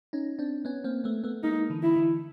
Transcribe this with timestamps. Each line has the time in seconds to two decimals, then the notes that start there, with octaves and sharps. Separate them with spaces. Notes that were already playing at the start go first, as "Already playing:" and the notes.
0.13 C#4 D#4
0.39 C4 D4
0.65 B3 C#4
0.84 A#3 C4
1.04 A3 B3
1.24 A3 B3
1.43 G#3 A#3 D#4
1.70 D3 E3
1.83 E4
1.96 D3 E3